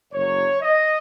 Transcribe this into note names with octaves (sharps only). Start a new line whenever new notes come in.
F#1 F#2 F#3 C#5
D#5